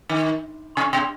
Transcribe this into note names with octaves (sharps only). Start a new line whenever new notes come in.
D#3
C3
B2